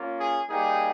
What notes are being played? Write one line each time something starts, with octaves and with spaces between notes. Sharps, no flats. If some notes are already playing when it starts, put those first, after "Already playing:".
Already playing: A#3 C#4 F4
G#4
G3 A#3 D#4 G4 G#4